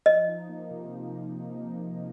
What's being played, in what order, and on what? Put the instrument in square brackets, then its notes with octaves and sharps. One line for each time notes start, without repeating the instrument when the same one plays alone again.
[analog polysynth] F3 [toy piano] D#5
[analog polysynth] D#4
A#3
C3
F3